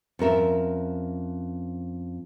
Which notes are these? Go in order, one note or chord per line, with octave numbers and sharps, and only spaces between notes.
F2 C#4 A#4 E5